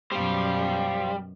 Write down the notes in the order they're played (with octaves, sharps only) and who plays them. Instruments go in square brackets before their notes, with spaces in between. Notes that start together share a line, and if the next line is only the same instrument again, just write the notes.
[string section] F#2 B2 [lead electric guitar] G3 [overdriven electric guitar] C5 F5